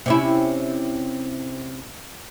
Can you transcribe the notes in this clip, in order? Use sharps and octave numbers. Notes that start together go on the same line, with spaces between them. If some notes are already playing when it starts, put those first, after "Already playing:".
C3 C#4 E4